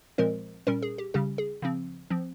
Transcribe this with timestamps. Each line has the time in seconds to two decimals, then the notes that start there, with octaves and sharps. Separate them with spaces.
0.18 A#2 F3 G#3 C4 A#4
0.67 A#2 G3 C#4 A#4
0.82 G#4
0.98 G4
1.14 C#3 G3 C#4 G4
1.38 G#4
1.62 C#3 F3 C4
2.10 F3 C4